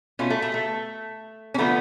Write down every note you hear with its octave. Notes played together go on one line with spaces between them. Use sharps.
B2 A3 C#4 F4
A3
A3
A3
C#4
D3 F3 A3 B3